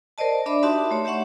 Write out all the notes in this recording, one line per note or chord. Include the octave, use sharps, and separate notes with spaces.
A#4 C5 D5 D#5 A5
D4 D5 E5 B5 D6
D#4 F#4 G4 E5 A5 C6
A3 C#5
G4 C#5 E5 F#5 C#6